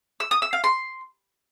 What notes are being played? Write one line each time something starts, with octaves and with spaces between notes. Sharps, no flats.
E6
D#6
E6
F5
C6